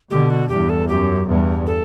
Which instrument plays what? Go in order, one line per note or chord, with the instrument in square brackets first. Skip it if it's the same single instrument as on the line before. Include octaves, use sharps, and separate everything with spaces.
[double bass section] B2 D3 [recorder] G4
[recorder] F#4
[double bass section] E2 G2 [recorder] G4
[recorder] A4
[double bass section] F#2 [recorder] G4
[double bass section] E2 G2
[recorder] A4